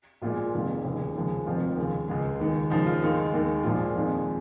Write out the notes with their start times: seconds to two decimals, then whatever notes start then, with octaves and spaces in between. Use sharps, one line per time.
0.22 A#1 A#2 G#3 F4
0.54 F1 F2 D#3 G#3
0.84 F1 D#2 C#3
1.15 D#2 C#3 F3 G#3
1.46 F1 F2 F3 F4
1.77 D#2 C#3 G#3
2.08 C#2 C#3 G#3
2.40 D#2 D#3 G#3
2.70 D#2 C#3 F3 D#4
2.87 F4
3.02 D#2 D#3 G#3 D#4
3.33 D#2 D#3 G#3
3.64 A#1 A#2 F3 G#3 F4
3.96 F2 D#3 G#3